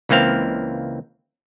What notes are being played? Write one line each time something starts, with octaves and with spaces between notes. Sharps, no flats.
C#2 E3 A#3 C4 F5